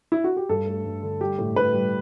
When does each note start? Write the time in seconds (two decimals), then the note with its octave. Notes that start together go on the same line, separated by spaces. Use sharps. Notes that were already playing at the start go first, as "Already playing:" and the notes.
0.12 E4
0.24 F#4
0.37 G4
0.49 G2 A4
0.67 A3
0.85 G2
1.03 D3
1.20 G3 G4
1.39 A2
1.56 A2 B4
1.74 G3